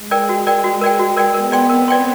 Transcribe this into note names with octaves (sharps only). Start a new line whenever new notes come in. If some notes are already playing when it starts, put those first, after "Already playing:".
Already playing: G#3
A#4 D5 G5
G#3 F#4
A#4 D5 G5
F#4
A#4 D5 G5
F#4
A#4 D5 G5
B3 A#4
D5 G5 C6
C4 A#4
D5 G5 C6